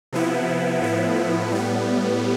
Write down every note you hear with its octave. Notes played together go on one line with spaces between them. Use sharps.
C3 F3 B3 E4
A2 F3 B3 E4
A2 G3 B3